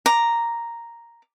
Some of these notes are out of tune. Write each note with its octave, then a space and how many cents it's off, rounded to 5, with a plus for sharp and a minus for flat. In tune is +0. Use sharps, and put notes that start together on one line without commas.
A#5 +0 D6 +0